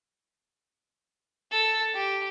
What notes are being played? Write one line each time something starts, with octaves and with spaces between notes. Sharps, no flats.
A4
G4